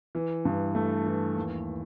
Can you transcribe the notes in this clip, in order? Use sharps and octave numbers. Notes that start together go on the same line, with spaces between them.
E3
G2
A3
E3
D#2